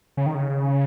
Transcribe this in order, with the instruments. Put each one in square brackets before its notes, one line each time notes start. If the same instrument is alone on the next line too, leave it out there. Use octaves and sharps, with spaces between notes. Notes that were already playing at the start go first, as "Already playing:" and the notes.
[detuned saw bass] C#3
D#3
C#3